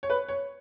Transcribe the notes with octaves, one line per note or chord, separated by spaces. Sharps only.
C#5
B4
C#5